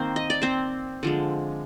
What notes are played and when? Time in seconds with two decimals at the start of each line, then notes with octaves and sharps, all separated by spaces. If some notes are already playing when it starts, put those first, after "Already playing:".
Already playing: D#3 A#3 C4 C5
0.16 D#5
0.30 D5
0.42 C4 C5
1.03 D3 F3 G#3